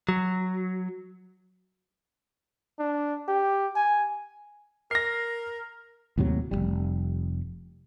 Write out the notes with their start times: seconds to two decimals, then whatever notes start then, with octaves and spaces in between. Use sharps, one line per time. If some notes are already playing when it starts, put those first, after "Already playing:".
0.09 F#3
2.79 D4
3.28 G4
3.76 G#5
4.91 A#4 A#6 C7
6.18 D#2 A2 C3 F#3
6.51 F1 C#2 G3